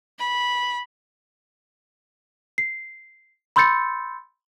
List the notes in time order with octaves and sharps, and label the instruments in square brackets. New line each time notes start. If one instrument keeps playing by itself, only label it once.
[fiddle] B5
[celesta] C7
B5 C6 E6 G6 A6 C#7